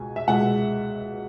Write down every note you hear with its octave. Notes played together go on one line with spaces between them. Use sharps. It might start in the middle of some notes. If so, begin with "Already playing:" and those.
Already playing: C#2 B2 G#3 G#5
E5
C#2 B2 G#3 F#5